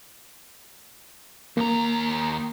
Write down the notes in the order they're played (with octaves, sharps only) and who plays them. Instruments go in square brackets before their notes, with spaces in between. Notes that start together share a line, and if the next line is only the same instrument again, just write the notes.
[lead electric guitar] D#2 A#5 [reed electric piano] A#3